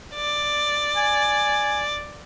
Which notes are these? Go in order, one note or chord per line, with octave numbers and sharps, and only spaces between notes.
D5
G#5